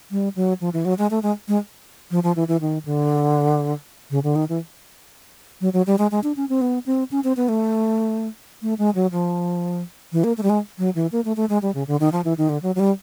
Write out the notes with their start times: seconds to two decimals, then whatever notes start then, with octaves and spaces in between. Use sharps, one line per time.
0.11 G3
0.36 F#3
0.61 F3
0.73 E3
0.85 F#3
0.98 G#3
1.11 A3
1.23 G#3
1.48 G#3
2.11 F3
2.23 F3
2.36 E3
2.48 E3
2.61 D#3
2.85 D3
4.11 C#3
4.24 D3
4.36 D#3
4.49 E3
5.61 F#3
5.73 F#3
5.87 G3
5.98 G#3
6.11 G#3
6.24 D4
6.37 C#4
6.49 C4
6.61 B3
6.86 C4
7.11 C#4
7.24 C4
7.37 B3
7.49 A3
8.62 A3
8.79 G#3
8.95 F#3
9.12 F3
10.12 E3
10.24 A#3
10.37 A3
10.43 G3
10.50 G#3
10.78 F#3
10.95 E3
11.12 A#3
11.25 A3
11.37 A3
11.49 G#3
11.62 G3
11.75 C#3
11.88 D3
12.00 D#3
12.12 F3
12.25 E3
12.38 D#3
12.49 D3
12.62 F#3
12.75 F#3
12.80 G3